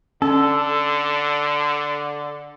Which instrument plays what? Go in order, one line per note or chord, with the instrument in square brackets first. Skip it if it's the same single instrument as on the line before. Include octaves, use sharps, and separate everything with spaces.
[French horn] D3 [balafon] C#4 [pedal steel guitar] A4